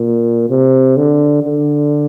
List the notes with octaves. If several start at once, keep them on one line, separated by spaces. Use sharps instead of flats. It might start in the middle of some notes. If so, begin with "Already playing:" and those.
Already playing: A#2
C3
D3
D3